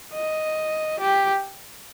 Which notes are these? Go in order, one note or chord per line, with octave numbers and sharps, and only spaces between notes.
D#5
G4